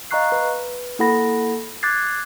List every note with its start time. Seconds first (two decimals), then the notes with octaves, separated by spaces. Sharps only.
0.11 D#5 F5 A#5 C#6 F#6 C7
0.32 B4
0.99 A#3 E4 A4 F#5 B5 A#6
1.83 D6 F#6 G#6 A6 C7